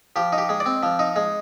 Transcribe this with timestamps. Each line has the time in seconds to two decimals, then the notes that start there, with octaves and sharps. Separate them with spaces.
0.16 F3 G4
0.33 D#4
0.38 G4
0.49 G#3
0.60 D5
0.66 C4
0.83 F3
0.99 D#4
1.16 G#3